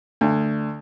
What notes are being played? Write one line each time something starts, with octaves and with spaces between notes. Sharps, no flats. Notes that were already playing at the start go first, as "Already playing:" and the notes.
D2